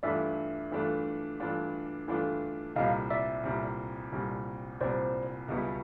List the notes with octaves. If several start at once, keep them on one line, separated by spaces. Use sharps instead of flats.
G2 E3 A3 D4 F4 D5 E5
G2 E3 A3 D4 F4
G2 E3 A3 D4 F4
G2 E3 A3 D4 F4
C2 A#2 G3 C4 D#5 F5
D5 E5
C2 A#2 G3 C4
C2 A#2 G3 C4
C2 A#2 G3 C4 C5 D5
C#2 B2 G3 B3 E4